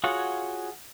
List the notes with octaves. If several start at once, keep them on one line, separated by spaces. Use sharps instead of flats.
F4 F#4 G#4 C#5 F#5